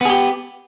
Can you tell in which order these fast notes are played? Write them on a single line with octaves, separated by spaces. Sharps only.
B3 G#4 G4